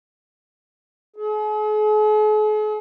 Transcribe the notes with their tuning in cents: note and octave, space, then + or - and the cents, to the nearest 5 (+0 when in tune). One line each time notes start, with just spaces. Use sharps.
G#4 +45